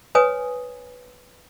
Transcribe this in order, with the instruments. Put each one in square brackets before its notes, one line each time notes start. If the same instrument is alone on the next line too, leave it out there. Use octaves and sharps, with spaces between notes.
[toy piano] B4 C#5 G#5 D#6